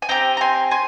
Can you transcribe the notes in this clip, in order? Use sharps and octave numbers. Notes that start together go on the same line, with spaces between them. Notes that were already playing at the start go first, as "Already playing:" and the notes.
G#5
C4 G4 G5 A#5
A#5
G#5 C6
G#5 C6